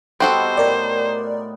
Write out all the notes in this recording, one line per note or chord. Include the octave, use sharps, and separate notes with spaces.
G3 B3 C4 D#4 F#4 A4 C5
A2 A#4 D5